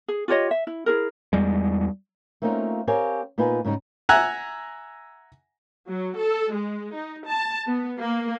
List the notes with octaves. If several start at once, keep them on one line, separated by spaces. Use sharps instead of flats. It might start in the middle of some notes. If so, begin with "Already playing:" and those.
G#4
F4 G4 C#5 D#5
E5
E4
E4 G#4 A#4
E2 G3 G#3
A3 A#3 C4 C#4 D#4 F4
C4 G4 A#4 C#5 F5 G#5
A#2 B3 D#4 F4 B4 G#5
G#2 C#3 G3 D#4
E5 F#5 G#5 A#5
F#3
A4
G#3
D#4
A5
B3
A#3